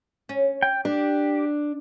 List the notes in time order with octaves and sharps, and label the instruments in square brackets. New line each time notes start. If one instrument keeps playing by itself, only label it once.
[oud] C#4
[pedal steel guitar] G5
[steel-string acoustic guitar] D4 [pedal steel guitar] G4